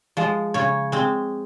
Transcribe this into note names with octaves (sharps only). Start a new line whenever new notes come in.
F3 G#3
C#3 C#5
G#3 C4